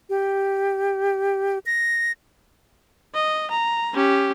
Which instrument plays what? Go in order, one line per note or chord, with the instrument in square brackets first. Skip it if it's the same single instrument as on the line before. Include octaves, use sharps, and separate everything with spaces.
[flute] G4
A#6
[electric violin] D#5
A#5
C#4 G4